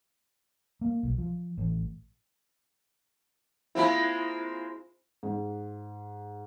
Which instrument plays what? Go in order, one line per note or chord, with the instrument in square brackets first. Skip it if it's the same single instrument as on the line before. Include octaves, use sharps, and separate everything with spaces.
[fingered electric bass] A#3
B1
F3
A1
[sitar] G#3 A#3 C4 [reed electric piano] E4 F4 B5
[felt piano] G#2